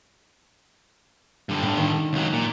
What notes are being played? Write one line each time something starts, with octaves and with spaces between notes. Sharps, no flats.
G2 D3
A2
D#3
C#2 F#3
A#2